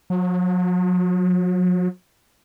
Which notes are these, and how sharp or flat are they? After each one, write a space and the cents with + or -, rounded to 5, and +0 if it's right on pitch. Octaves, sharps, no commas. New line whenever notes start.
F#3 -40